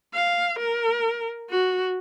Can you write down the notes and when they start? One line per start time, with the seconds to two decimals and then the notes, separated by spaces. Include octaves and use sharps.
0.14 F5
0.59 A#4
1.50 F#4